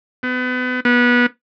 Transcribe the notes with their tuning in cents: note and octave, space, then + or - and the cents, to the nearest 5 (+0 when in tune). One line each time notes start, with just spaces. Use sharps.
B3 +35
B3 -20